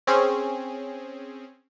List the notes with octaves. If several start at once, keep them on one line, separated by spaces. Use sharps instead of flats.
C4 C#4 G#4